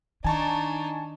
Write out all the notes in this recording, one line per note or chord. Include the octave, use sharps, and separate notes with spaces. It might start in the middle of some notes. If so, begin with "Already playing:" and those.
D#3 D4 D#4 G#5 A5 C#6